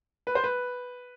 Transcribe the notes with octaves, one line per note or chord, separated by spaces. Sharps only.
B4
C5
B4